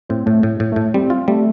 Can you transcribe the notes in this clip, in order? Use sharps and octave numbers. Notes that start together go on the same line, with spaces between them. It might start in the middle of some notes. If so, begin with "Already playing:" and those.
A2 C4
A2 A3
A2
A2
A2 A3
G3 C4
F4
G3 A3